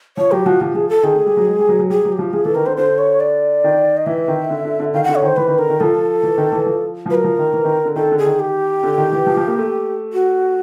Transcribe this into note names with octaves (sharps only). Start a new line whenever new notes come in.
F3 C#5
F#3 G4
F3 F#4
F3 G4
F3 G#4
A4
D#3 G#4
A3
G3
F#3
G#3
G3
F#3
F#3
G3 G#4
F#3
G4
F3
F3 G#4
E3 A4
D#3 A#4
D3 C5
D3 C5
C#5
D5
D#3
D#5
E3 E5
D#3
D3
D3
D3
D#3 F5
D3 F#5
C#5
D#3 C5
E3 B4
D#3
D3 A#4
D#3
F3 A4
E3
D#3
E3
F3
F3
F#3 B4
A#4
F3
D#3
E3
D#3
D3
D#3 A4
D3
G#4
D#3
G4
D3
D#3
E3
F3
F3
A#3
A3
F#4